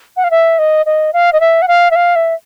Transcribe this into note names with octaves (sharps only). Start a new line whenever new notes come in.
F#5
F5
E5
D#5
D#5
F5
D#5
E5
F#5
F5
E5
F5
E5